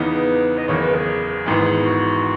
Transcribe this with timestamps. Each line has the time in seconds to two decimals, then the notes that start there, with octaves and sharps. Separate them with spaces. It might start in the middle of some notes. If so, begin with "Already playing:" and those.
Already playing: E2 C#3 E3 B3 D#4
0.09 B4
0.58 D#5
0.68 F#1 E2 C#3 C#5
0.81 B4
0.95 G#4
1.46 G#1 G#2 E3 B3
1.85 F#4